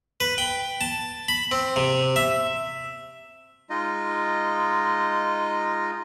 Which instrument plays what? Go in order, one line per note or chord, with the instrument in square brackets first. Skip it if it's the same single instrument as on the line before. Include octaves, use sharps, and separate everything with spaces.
[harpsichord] B4
G5
A5
B5
C4
C3
E5
[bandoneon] G#3 D#4 F4 D#5